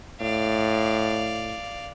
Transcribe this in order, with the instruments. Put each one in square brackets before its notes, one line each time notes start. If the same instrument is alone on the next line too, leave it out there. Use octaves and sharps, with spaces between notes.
[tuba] A2 [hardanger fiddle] D5 F5